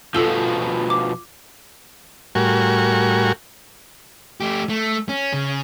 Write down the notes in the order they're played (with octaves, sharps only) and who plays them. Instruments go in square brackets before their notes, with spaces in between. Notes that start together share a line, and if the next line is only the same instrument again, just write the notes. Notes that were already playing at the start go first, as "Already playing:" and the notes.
[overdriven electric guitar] B2 F3 [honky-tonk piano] F4 [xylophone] A4 E6 G7
[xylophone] D6
[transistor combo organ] A2 G3 F#4 A#4 G#5 C#6
[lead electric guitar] A3 G4
A3
C#4
C#3